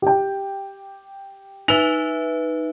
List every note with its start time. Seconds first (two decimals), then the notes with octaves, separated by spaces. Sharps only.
0.02 G4 G5
1.68 D#4 B4 E5 F7